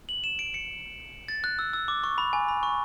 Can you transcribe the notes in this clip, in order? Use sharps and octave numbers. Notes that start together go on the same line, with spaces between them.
F#7
E7
D7
C#7
A6
F#6
E6
E6
D6
C#6
B5
G#5
B5
C#6